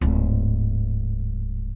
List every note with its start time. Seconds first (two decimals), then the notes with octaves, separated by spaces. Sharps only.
0.01 D1 G#2